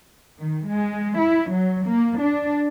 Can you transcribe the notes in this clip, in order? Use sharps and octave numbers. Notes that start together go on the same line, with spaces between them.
D#3
G#3
E4
F#3
A#3
D4